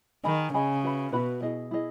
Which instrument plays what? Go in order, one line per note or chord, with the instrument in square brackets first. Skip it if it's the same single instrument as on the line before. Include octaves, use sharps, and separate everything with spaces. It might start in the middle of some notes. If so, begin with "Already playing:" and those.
[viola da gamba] D#3 [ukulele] G#4 D#5 G#5 B5
[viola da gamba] C#3 [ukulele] G#4 D#5 G#5 B5
[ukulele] F#4 B4 E5 B5
[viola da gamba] B2 [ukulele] F#4 B4 E5 B5
[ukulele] E4 G#4 D#5
E4 G#4 D#5